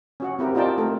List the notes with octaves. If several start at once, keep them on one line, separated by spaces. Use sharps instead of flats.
C#4 F#4 F#5
C4 E4 G4 A#4
D#4 F4 A#4 D5 G5 A5
A3 A4 A#4 A5